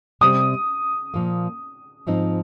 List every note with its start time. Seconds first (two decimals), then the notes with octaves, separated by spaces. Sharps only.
0.21 C3 G3 C4 D#6
1.14 A#2 F3 A#3
2.07 G#2 F3 C4 D#4